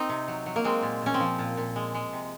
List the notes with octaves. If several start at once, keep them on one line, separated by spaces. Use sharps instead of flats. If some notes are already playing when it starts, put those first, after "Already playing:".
Already playing: C4 D#4
C3
F#3
F#3
A#3
G#3 C4
A#2
A#2 C#4
C4
F3
A#2
A#2
G#3
G#3
C3